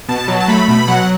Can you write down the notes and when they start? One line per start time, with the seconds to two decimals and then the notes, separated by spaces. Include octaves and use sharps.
0.09 B2 A5
0.28 F#3
0.40 A5
0.48 A3 B5
0.68 B2 B5
0.88 F#3 F#5